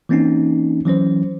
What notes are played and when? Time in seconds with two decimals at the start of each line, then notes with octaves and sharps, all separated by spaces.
0.09 E3 A#3 C4 C#4 D#4
0.85 E3 F#3 C#4 C5